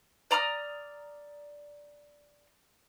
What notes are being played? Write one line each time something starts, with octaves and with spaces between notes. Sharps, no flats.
D5 A#5 D#6 F6